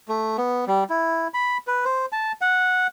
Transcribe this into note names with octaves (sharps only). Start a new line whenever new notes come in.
A3
B3
G3
E4
B5
B4
C5
A5
F#5